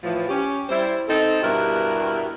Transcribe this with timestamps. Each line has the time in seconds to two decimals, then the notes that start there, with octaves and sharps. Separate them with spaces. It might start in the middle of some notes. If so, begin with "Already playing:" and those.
0.04 A2 E3 F3
0.28 C#4 G4
0.69 G3 E4 C5
1.08 C4 D#4 A4
1.42 G2 B2 B3 E4 G4 A#4